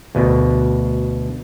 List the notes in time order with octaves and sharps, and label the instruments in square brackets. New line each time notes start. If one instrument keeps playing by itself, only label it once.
[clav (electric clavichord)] D2 B2